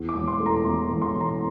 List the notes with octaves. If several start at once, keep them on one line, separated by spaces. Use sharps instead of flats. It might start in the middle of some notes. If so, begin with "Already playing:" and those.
Already playing: E2
D6
E1
C6
A3
A#5
E1 C6
E1
C6
E1
A#5